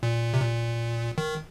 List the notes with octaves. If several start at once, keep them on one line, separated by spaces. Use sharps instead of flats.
A#2
C3
A#2
D#3